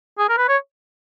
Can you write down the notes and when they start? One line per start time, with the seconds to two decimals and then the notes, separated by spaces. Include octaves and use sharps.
0.19 G#4
0.29 A#4
0.38 B4
0.49 C#5